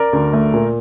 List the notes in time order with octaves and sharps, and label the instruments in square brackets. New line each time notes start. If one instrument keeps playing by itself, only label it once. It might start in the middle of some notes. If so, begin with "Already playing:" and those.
Already playing: [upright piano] A#4 D5
D2
A3
A#2